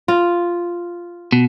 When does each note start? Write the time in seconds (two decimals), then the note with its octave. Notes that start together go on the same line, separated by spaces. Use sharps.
0.08 F4
1.32 B2